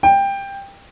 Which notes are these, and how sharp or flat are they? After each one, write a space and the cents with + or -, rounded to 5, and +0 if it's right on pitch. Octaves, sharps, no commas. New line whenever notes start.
G5 +15